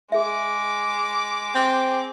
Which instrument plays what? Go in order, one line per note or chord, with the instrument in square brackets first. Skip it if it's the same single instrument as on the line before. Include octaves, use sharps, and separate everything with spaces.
[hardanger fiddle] G#3 D6 [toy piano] G#4 E5
[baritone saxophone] C4